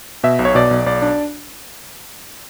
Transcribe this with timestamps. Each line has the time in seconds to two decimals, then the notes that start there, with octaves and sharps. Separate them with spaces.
0.24 B2 E5
0.39 B1
0.45 C#5
0.55 B2 D5
0.71 B1
0.86 B1 D5
1.02 D4